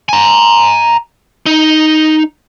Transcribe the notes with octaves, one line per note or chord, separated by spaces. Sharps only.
G#5 A#5
D#4